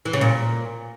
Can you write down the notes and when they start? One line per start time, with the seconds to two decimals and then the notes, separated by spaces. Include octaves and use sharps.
0.05 E3
0.13 C#3
0.21 A#2